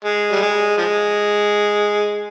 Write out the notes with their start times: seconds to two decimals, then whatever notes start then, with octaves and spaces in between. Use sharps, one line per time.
0.05 G#3
0.32 G3
0.42 G#3
0.77 F3 G#3